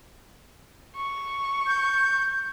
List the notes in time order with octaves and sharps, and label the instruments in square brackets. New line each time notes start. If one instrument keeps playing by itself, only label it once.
[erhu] C#6
[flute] G6